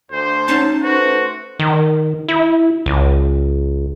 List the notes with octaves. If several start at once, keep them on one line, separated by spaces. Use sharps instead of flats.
D2 C5
C#4 D#4 A5
A3 F#4 B4 C5
D#3
E4
C#2